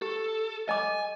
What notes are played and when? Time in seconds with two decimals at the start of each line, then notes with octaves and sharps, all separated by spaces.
0.02 G4 A4
0.69 D#5 G#5 D6